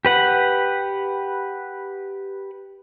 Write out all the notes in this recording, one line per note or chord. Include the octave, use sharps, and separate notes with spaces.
G4 B4 F#5